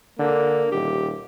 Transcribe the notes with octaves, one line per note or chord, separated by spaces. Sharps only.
D3 A#3
D#1 G4